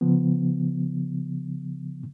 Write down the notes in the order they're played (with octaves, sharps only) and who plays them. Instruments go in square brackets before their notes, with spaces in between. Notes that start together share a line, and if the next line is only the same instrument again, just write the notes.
[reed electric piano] C#3 F3 B3